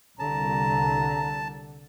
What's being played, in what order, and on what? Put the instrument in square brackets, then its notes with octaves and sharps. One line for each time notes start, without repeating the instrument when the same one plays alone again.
[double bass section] C2 [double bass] D3 [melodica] A5 [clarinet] A#5